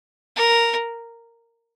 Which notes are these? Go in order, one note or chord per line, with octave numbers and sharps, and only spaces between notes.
A#4